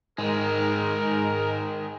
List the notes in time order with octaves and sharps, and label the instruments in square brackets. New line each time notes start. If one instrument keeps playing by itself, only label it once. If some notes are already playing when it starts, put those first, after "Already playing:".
[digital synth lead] G#2 [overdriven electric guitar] D#3 G#3 [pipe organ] A#4